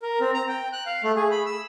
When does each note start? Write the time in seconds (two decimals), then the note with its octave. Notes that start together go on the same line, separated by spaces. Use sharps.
0.02 A#4
0.20 C4
0.34 A#5
0.48 G5
0.73 F#6
0.86 F5
1.04 A3
1.16 G#4
1.31 B5
1.46 E6